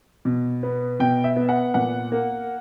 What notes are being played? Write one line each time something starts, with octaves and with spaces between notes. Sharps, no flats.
B2
B3
B2 G5
E5
B3
F#5
A#2 F#5
A#3